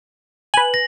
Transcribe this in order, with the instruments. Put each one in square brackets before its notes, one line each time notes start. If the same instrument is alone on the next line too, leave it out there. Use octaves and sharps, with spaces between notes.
[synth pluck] B4 G#5 [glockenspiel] F#7
[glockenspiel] A#6